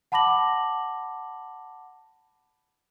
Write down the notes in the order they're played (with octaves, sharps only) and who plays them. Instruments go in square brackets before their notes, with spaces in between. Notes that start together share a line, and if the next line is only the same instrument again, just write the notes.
[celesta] F#5 A5 B5 D6 A#6 F#7